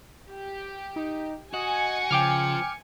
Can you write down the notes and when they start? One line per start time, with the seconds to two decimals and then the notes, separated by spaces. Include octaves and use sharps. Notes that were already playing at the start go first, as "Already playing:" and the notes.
0.30 G4
0.96 D#4
1.54 F#4 D#5 G#5 C#7
2.11 C#3 F3 G5 D6 F6